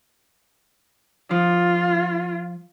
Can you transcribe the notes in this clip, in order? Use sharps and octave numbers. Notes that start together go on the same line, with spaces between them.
F3 F4